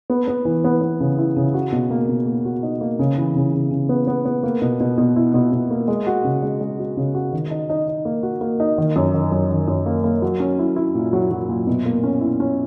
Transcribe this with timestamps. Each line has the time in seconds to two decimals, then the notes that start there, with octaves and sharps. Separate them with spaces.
0.10 B3
0.28 B3
0.45 E3
0.65 B3
0.82 B3
1.01 C#3
1.18 E4
1.37 C#3
1.54 F#4
1.72 B2
1.91 A#3
2.09 B2
2.26 A#3
2.45 F#4
2.63 D#4
2.81 A#3
2.99 C#3
3.18 E3
3.36 C#3
3.54 C#3
3.71 C#3
3.89 B3
4.07 B3
4.26 B3
4.43 A#3
4.62 B2
4.80 B2
4.98 B2
5.16 E4
5.34 B2
5.52 B2
5.71 A#3
5.88 G#3
6.07 F#4
6.24 C#3
6.42 G#3
6.61 G#3
6.79 F#4
6.97 C#3
7.15 F#4
7.32 D#3
7.51 D#4
7.70 D#4
7.88 D#4
8.05 A#3
8.23 F#4
8.41 A#3
8.60 D#4
8.78 D#3
8.96 F#2
9.14 D#3
9.32 F#2
9.51 D#3
9.68 F#2
9.86 A#3
10.04 A#3
10.22 F#3
10.40 C#4
10.59 E4
10.76 E4
10.95 A#2
11.13 F#3
11.31 F#3
11.49 A#2
11.67 B2
11.85 A#3
12.03 C#4
12.21 E4
12.40 C#4